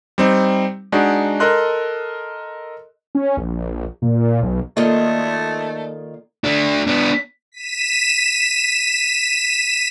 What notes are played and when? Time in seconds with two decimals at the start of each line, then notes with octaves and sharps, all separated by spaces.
0.18 G3 C4 D#4
0.92 G#3 D4 D#4 F#4
1.40 A4 A#4 D#5 C6 F#6
3.15 C#4
3.37 A#1
4.02 A#2
4.43 B1
4.77 D#3 A3 A#3 F4 A4 D5 D#5
6.44 A3 D4
6.87 B3 D4
7.52 B6 D#7 E7